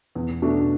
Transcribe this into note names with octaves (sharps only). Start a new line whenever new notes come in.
E2
B2 A3 D4 F#4